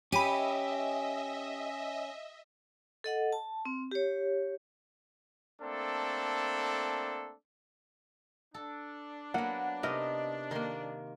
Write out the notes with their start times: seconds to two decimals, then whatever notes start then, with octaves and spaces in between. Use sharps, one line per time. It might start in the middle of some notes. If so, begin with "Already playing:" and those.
0.12 C#4 G4 D#5 E5 B5 D#7
3.04 A4 D#5 F#5
3.33 A5
3.65 C4
3.91 G4 C#5
5.62 A3 A#3 C4 D4 A4
8.54 D4 A4
9.34 F#3 A#3 B3 F#5
9.83 C3 B3 D#4 A#4 D#5
10.51 D#3 A#3 A#4 C6